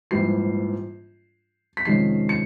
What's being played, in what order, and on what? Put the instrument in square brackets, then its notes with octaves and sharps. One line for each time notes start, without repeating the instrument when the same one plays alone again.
[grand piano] A#1 G#2 E3 G3 C7
B6
F2 C3 D#3 G#3 C#4 C7
C#7